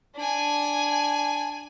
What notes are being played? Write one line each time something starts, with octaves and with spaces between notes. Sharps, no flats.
D4 G#5